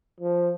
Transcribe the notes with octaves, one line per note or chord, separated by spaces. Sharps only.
F3